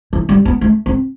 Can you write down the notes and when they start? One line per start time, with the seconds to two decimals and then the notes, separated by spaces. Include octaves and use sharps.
0.13 E3
0.29 G3
0.45 B3
0.61 A3
0.86 C4